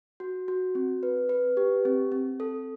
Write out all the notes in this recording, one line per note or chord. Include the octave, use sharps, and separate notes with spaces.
F#4
F#4
C4
B4
B4
G4
C4
C4
A4